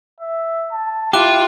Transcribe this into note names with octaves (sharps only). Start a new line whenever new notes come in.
E5
A5
E4 F4 G4 F5 D6 F#6